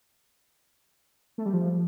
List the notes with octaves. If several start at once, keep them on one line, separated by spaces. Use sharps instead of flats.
A3
G3
F3